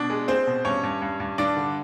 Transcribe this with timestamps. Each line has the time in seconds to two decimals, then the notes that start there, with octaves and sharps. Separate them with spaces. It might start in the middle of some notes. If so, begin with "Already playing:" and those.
Already playing: B2 D4 D5
0.10 G#3
0.28 G#3 C4 C5
0.47 B2
0.65 G2 C#4 C#5
0.83 G2
1.02 G2
1.20 G2
1.38 G2 D4 D5
1.57 D3